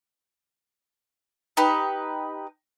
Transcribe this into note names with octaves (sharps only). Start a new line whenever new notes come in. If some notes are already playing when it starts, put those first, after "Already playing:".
D#4 G4 B4